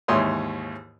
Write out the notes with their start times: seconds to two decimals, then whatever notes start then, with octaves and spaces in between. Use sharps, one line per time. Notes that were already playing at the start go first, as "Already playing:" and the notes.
0.08 D#2 G#2 E3 C#5 C6 D#6